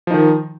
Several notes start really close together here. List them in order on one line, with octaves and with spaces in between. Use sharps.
F3 D#4 D#3